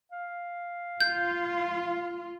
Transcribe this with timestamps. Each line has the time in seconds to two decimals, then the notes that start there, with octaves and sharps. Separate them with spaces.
0.11 F5
1.01 F4 G6